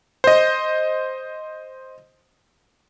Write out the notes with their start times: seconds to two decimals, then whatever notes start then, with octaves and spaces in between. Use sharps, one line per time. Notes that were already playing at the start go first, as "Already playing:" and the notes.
0.24 C5 D#5